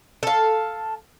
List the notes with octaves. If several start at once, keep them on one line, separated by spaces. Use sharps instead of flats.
A4 F5